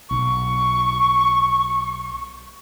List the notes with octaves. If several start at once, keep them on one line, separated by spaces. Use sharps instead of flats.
B1 C#6